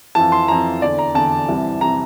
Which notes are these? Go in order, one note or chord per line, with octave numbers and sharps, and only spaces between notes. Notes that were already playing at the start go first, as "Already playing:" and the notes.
F2 E3 A5
C6
F2 E3 A#5
E2 D3 D5
A#5
E2 D3 A5
C2 C3 E3
C3 E3 A#5